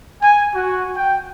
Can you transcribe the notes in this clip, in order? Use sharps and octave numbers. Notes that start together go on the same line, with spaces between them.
G#5
F#4
G5